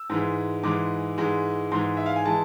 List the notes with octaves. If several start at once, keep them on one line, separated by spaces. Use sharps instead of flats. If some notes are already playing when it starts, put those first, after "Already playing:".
Already playing: E6
G#2 E3 G#3
G#2 E3 G#3 D6
G#2 E3 G#3
G#2 E3 G#3 C6
E5
F5
G#5
E3 G#3 A5